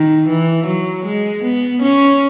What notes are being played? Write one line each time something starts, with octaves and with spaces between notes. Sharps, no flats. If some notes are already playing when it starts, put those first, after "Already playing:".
Already playing: D#3
E3
F#3
G#3
B3
C#4